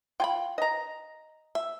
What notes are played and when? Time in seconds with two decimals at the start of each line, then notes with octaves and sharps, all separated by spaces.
0.20 F4 G5 G#5 B5
0.58 D#5 A#5
1.55 E5